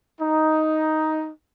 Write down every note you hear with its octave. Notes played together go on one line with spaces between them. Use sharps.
D#4